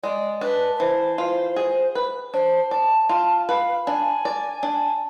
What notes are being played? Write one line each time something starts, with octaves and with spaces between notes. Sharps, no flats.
G#3 D5
D4 B4
B4
E3 C5
F4
G#4
B4
D4 C5
D5 A5
F4 A5
B4 F5
D4 G#5
D5
D4